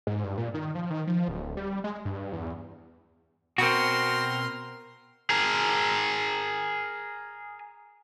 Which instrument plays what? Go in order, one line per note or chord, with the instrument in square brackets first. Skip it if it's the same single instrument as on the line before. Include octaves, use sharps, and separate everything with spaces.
[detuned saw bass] G#2
G2
A#2
D#3
F3
D#3
F3
D1
G3
G#3
G2
E2
[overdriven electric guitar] B2 [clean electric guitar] C4 F#4 [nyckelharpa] A#4 C6
[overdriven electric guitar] G#4 A#4